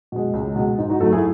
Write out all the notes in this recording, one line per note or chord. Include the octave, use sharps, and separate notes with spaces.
B2 G#3
C#2
B2 G#3
G#2 D#4
D#4 F#4
F#3 A3 F#4 A4
E4 G#4